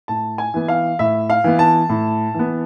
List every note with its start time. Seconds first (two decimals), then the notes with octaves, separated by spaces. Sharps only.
0.08 A2 A5
0.38 G#5
0.54 E3 B3
0.68 F5
0.99 A2 E5
1.30 F5
1.44 E3 B3
1.59 A5
1.89 A2
2.34 E3 B3